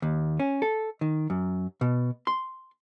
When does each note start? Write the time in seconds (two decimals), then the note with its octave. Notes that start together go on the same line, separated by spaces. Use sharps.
0.02 D#2
0.40 C#4
0.62 A4
1.01 D#3
1.30 F#2
1.81 B2
2.27 C6